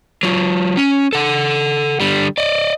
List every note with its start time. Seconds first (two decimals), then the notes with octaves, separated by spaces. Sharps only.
0.23 F#3 F4
0.77 C#4
1.13 A4 F#5
2.00 D3 G3
2.38 D5 D#5